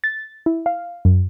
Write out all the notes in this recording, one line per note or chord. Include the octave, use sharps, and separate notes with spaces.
A6
E4
F5
F#2